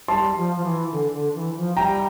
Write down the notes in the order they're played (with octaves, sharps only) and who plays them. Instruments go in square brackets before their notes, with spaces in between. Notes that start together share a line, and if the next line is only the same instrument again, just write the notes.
[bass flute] G3 [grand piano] A5 C6
[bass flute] F3
F3
E3
D3
D3
E3
F3
[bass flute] G3 [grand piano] G5 A#5